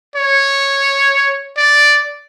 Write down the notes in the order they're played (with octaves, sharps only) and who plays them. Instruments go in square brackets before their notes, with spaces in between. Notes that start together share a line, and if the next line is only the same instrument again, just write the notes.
[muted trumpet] C#5
D5